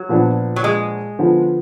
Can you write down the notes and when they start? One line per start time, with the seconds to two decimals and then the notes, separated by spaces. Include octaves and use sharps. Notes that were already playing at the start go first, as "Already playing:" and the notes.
Already playing: F#3
0.09 A#2 F3 B3 D4
0.56 F#3
0.64 G#3
1.19 D3 F3 B3 F4